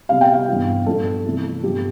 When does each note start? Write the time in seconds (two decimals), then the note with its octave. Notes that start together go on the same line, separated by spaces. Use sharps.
0.09 C3 G3 B3 F5
0.21 G5
0.34 F5
0.48 G2 E3 B3
0.86 G2 F3 B3 A4
1.25 C3 E3 A3
1.63 G2 F3 B3 G4